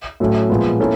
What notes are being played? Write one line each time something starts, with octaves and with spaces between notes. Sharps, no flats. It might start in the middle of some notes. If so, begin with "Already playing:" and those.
A2 F#3 A3 C#4
A#2 F3 G#3 B3
A#3 C#4 E4 A4